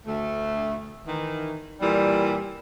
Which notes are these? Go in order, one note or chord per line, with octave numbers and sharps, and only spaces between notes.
D2 A3
D#3 E3
A#2 E3 G3